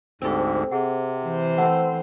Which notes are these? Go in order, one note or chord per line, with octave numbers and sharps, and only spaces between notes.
D2 G#2 C4 G4 A4
C3 G#4 F#5
E3 C5
A3 C4 F#5